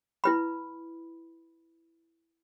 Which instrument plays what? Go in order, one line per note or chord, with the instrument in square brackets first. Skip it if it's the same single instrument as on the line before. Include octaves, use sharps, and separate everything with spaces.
[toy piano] E4 B4 B5